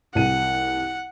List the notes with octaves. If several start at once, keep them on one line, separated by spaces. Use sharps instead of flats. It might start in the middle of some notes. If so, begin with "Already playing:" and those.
C2 F#5 D#7